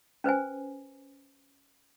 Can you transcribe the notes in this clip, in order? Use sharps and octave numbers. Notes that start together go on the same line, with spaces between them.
C#4 B4 C5 G#5